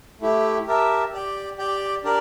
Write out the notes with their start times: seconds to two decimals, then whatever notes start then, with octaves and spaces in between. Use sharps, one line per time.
0.21 A3 E4 G4
0.67 G4 A#4 E5 A5
1.12 G4 D5 G5
1.58 G4 D5 G5
2.04 D4 G4 A#4 D5